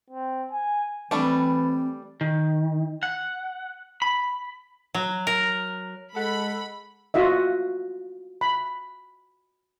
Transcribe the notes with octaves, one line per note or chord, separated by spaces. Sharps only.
C4
G#5
E3 G3 A3 C4 D4
D#3
F#5
B5
F#3
A#4
G#3 A4 F#5 B5
F4 F#4 D#5 E5
B5